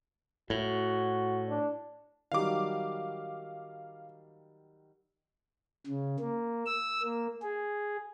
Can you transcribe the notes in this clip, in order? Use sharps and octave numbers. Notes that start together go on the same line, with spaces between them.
A2 F#4
D4
D#3 F#3 G3 F5 D6
C#3
A#3
E6
A#3
G#4